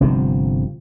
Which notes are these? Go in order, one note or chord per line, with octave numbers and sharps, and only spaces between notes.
G1 C3 F3